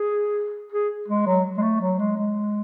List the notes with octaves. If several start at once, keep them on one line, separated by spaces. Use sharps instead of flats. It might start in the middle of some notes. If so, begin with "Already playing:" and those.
Already playing: G#4
G#4
G#3
F#3
G#3
A3
F#3
G#3
G#3